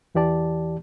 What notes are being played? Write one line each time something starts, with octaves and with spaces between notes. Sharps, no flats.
E2 E3 G4 D5 A5